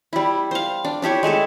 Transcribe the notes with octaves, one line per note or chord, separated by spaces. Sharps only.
G3 E4
C5 F5
D4
D4 E4 G4 C#5
G#3 A3 E4 A4